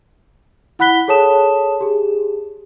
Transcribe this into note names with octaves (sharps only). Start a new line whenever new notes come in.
E4 F#5 B5 F#6 B6 G7
G#4 A4 C#5 A5 D#6 E7
G4 G#4